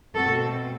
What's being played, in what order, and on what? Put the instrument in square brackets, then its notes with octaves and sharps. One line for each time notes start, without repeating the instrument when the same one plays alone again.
[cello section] B2 A3 C4 F#4 A4